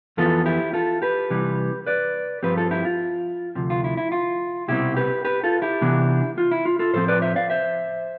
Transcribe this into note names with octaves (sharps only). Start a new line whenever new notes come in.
F2 E3 B3 F4 A4
E4 G4
F4 A4
G4 B4
C3 E3 G3
B4 D5
G2 F3 C4 G4 B4
F4 A4
E4 G4
F4
D2 C3 F3
F4
E4
E4
F4
C2 B2 G3 C4 E4 G4
G4 B4
G4 B4
F4 A4
E4 G4
C3 E3 B3 D4
F4
E4
F4
F4 A4
A2 F3 C4 A4 C5
B4 D5
C5 E5
D5 F5
C5 E5